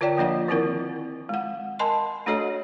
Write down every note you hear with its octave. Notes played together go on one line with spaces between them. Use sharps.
D3 F4 C#5 D5 G5
F3 A#3 D4 D#5 F#5
D#3 F3 C4 E4 A#4
G#3 F#5
A#4 D#5 G#5 A5 B5 C6
A3 D4 F#4 A4 C#5 D#5